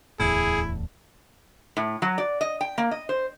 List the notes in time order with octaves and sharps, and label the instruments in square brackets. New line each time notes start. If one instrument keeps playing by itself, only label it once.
[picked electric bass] D1 E2 A2 [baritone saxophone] E4 [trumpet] G#4
[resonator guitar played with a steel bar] A2
F#3
D5
D#5
G5
A#3
D#5
C5